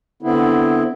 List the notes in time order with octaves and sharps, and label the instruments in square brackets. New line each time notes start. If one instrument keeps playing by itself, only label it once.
[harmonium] D3 B3 C4 E4